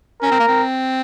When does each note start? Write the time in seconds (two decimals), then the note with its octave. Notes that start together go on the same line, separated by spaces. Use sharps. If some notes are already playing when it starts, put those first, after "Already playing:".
0.22 C#4 A#4
0.31 C4
0.40 A#3
0.48 C4